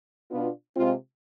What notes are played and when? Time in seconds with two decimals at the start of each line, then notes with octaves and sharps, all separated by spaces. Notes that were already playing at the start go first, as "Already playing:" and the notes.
0.31 B2 B3 D4 F4
0.76 C3 G#3 C4 F4